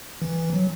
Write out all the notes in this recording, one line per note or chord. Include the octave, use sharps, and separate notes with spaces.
E3
F#3